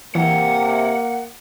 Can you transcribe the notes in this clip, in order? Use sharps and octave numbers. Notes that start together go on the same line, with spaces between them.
C3 E3 A#3 F#5